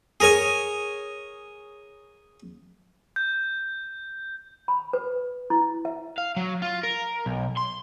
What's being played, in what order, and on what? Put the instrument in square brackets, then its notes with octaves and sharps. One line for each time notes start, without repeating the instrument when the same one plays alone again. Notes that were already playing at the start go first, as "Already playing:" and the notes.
[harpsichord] G#4 A#4 C#5 G#5
[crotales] G6
[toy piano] B5
B4
E4
E5
[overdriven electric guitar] F5
F#3
F4
A#4
B1
C6